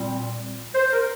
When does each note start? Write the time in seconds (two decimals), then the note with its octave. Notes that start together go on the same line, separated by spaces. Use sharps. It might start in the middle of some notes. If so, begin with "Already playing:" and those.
Already playing: A#2 G3 C4
0.75 C5
0.92 A#4